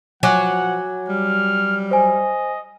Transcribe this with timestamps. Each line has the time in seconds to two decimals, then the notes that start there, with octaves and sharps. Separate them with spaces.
0.23 F3 F#3 F#5 G#5 D6 F#6
1.09 G3 F6
1.91 C5 D#5 G#5